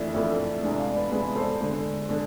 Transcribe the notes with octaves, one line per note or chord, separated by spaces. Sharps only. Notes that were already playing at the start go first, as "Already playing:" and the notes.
Already playing: F2 E3 A3 D4
F2 E3 A3 D4
E2 C3 G#3 D4
D5 F5
B4 D5
E2 C3 G#3 D4 G#4 B4
A4 C5
D3 G#3 D4
D3 G#3 D4